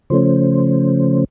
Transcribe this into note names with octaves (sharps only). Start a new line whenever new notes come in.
C#3 F3 A3 C#4 C5